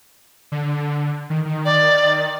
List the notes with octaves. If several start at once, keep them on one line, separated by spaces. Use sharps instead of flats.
D3
D#3
D#3
D5